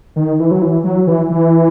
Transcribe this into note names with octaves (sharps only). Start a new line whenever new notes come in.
D#3
E3
F#3
E3
F#3
E3
E3